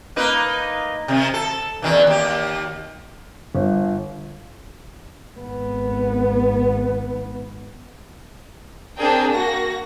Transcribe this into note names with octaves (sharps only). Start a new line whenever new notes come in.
A#3 D#4 B4
C3 D#3
A4
E2 D#3 E3
D#2 G4
G1
G#1 B3
C4 D4 G#4 A#4 G5
A#3 F#4 A#6